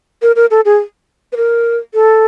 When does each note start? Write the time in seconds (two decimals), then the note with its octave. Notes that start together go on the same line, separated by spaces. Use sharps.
0.22 A#4
0.36 A#4
0.51 A4
0.65 G#4
1.33 B4
1.37 A#4
1.94 A4